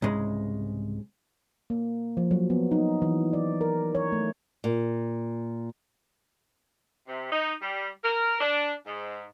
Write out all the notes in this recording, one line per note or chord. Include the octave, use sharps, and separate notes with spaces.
C2 G#2 C#3 G#3
A#3
F3
F#3
B3
D#4
E3
D5
A#4
C#5
A3
A#2
C3
D#4
G3
A#4
D4
G#2